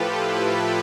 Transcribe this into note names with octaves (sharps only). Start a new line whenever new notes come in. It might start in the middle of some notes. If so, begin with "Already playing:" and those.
Already playing: A2 F3 F4 G4 A4 B4
E4 G4